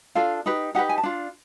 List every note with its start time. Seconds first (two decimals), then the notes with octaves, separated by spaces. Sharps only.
0.15 D4 F4 A4 F5
0.46 D#4 G4 B4
0.75 D#4 G4 B4 F#5
0.89 G#5
0.98 A5
1.03 D4 F4